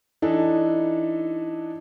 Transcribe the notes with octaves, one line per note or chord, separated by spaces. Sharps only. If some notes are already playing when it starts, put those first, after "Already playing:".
E3 D4 D#4 A4